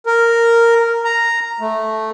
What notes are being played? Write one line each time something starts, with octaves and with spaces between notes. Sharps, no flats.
A#4
A#5
A3